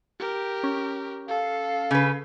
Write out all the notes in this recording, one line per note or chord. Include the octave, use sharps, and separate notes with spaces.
G4 A#4
C#4
A4 F5
C#3 B4